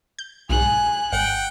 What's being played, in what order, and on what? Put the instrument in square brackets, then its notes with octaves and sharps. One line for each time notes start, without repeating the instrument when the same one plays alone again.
[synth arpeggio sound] G6
[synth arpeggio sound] B1 G#2 [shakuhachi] G#5 [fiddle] F#6
[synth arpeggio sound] G#1 [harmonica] F#5 G5